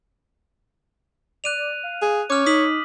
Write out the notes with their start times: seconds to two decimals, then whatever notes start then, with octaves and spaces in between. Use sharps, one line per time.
1.44 D5 F#6 D#7 F7
1.83 F5
2.02 G#4
2.30 C#4 C#5 D6 F6
2.46 D#4 D#6 B6 F#7